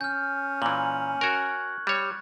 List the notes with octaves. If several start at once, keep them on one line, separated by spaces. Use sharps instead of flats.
C#4 F6 G6
A#2 E3 F#7
F#4 A#4 C#6 F#6 G#6
G3 C#5